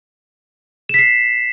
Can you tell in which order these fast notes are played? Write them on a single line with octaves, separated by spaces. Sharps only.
E7 B6 C7